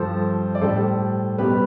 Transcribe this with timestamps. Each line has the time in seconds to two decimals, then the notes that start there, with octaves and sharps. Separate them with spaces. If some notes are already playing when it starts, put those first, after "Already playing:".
Already playing: G2 F3 A4 C5
0.55 D5
0.61 A2 G3 A4 C5
1.38 B2 G3 G4 B4